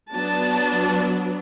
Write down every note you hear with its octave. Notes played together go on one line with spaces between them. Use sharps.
F#3 B3 D4 A5